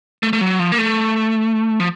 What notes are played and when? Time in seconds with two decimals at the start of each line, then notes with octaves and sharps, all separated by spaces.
0.23 A3
0.33 A3
0.41 F#3
0.59 F3
0.72 A#3
0.78 A3
1.80 F3